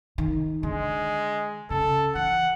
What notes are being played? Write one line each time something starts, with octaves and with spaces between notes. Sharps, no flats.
D#3
D3 G#3
C#3 A4
E3 F#5